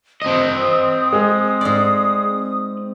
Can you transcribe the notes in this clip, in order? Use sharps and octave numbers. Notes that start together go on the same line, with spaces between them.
C4 D#5 D#6
G#3 G#4
G#2 D5